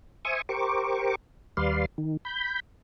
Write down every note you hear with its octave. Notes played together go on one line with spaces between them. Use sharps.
C5 E5 G#5 C#6 D#6
G4 A#4 C5 C#6 D6
D#2 G3 B4 D5 F5 C6
D#3
B5 G6